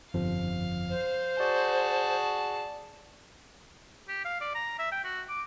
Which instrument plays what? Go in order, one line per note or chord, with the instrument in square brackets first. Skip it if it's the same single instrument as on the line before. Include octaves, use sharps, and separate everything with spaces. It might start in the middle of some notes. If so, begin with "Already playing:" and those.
[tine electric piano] G1 F2 F3 [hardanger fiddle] F5
[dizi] C5
[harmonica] F#4 G#4 [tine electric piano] D5 [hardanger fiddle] A5
[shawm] G4
F5
D5
A#5
E5
G5
F#4
D6